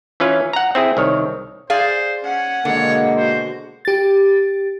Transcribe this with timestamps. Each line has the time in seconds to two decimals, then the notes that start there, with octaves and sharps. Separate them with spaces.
0.20 E3 C#4 F4 B4 F5
0.53 F#5 A#5
0.75 C4 E4 G#4
0.97 C2 D#3 C#5
1.70 G#4 C5 D5 F5
2.24 C#4 F#5
2.65 B2 D3 G#3 A#3 C#5
3.17 F#4 C5
3.85 G4 A6